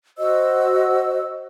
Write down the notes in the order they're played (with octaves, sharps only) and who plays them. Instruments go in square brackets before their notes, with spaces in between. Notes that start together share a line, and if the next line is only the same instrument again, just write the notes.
[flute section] F#4 C5 D#5 E6